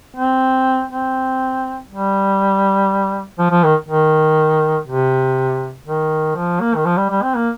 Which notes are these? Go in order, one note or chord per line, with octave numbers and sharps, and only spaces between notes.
C4
C4
G3
F3
F3
D#3
D#3
C3
D#3
F3
A#3
D#3
F3
G3
G3
C4
A#3